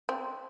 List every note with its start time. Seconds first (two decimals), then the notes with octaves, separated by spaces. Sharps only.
0.09 C4